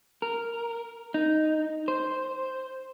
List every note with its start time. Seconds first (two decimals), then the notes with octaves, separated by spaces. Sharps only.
0.22 A#4
1.14 D#4
1.88 C5